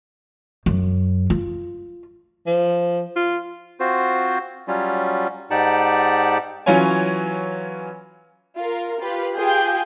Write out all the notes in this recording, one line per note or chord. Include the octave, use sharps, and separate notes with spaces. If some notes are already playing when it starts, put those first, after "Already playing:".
F#2
F4
F3
F4
C4 F4 F#4 C5
F#3 G3 C#4 F4
G#2 D#4 G4 D5 F#5 A5
E3 F#3 C#4 F4 C#5 G#5
F4 A#4
F4 G4 B4
F4 G4 G#4 G5 G6